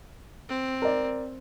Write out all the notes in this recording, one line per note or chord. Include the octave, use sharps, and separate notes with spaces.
C4
A#4 D5